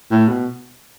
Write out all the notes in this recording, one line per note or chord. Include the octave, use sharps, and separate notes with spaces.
A2
B2